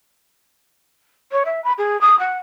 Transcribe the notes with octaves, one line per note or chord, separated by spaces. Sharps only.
C#5
E5
B5
G#4
D#6
F#5